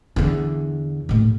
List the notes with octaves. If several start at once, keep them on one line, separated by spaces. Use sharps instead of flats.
E2 D3
D#1 A2